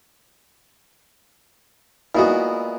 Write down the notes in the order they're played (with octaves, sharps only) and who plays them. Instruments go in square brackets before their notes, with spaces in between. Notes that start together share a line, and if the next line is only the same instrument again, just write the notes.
[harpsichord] A#2 G#3 B3 [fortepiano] E4 F#4